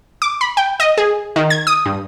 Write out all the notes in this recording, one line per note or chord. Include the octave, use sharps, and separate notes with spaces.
D6
B5
G5
D#5
G#4
D#3
G#6
D#6
G2